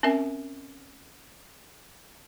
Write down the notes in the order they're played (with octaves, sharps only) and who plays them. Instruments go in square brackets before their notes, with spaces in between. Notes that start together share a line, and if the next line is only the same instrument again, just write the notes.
[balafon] C4 C#4 A#4 E5 G#5